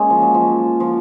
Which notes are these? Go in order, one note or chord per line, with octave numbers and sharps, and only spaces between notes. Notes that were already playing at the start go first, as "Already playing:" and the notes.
Already playing: G#3 A#3 C#4
F3
F#3
F3
F3